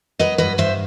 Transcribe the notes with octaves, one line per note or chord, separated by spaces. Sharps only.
F#3 B4 D#5
G2 B4 D#5
G2 C5 E5